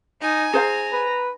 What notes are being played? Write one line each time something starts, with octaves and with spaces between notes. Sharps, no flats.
D#4 G#5
G#4 C5 F5 A#5
B4